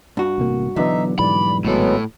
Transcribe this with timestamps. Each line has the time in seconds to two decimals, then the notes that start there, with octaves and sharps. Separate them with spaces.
0.17 G2 F#4
0.38 A1 C3 A#3
0.76 B1 D3 E3 F#3 B3 D#4 E5
1.19 G#2 E3 G3 D5 B5
1.65 G#1 A2 F#3 G#3 B3 A4